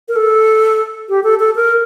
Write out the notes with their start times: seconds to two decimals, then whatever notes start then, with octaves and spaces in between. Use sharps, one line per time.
0.08 A#4
0.16 A4
1.09 G4
1.24 A4
1.40 A4
1.56 A#4